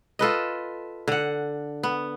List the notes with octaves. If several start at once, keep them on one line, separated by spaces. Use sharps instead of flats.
F4 A4 B4 D#5
D3 F#5
B3